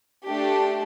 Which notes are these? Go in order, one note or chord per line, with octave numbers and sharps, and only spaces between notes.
A3 D4 G4